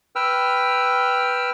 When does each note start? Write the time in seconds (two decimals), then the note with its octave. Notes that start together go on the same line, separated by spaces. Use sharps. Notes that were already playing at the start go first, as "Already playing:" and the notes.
0.16 B4 G5 E6 F6